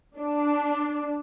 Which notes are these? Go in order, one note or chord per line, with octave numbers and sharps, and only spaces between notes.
D4